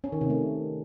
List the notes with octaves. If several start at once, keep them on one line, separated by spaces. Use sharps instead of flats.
C#4
D#3
C3
A3